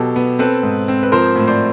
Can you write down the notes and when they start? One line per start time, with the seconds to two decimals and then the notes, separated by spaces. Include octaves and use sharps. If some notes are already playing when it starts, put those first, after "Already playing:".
Already playing: B2 F#3 G4 A4
0.16 B3
0.39 C4 A4 B4
0.63 G#2
0.88 C4
1.03 B4
1.12 F3 A#4 C5
1.36 A2
1.47 C5 D5